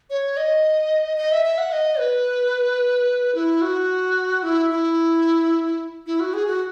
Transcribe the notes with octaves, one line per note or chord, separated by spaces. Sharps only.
C#5
D#5
D#5
E5
E5
F#5
D#5
B4
E4
F#4
E4
E4
E4
F#4
G#4
F#4